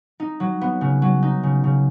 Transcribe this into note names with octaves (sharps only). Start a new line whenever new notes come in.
D#4
F#3
B3
C#3
F#3
D#4
C#3
C#3